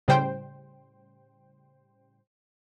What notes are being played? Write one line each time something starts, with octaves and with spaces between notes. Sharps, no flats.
A2 C#3 G3 C5 G5